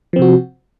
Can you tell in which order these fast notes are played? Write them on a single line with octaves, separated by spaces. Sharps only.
F3 C4 C3 F#4